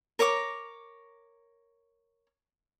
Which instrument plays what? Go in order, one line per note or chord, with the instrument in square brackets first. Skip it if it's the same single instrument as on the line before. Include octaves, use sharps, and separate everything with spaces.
[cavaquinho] A#4 C#5 A#5 D6